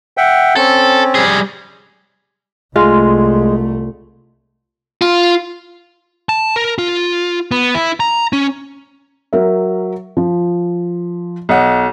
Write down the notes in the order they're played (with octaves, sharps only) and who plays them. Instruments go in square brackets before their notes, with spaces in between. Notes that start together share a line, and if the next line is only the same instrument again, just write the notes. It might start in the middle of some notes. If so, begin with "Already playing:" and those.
[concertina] E5 F#5 G5
[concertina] C4 C#4 [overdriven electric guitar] A4
[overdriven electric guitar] G3 G#4
[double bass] C2 A3 [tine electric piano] G#3 [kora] F4
[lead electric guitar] F4
[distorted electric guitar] A5
A#4
F4
B3
E4
A#5
C#4
[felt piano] F#3 A#4 E5
F3
[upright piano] B1 D#5 F#5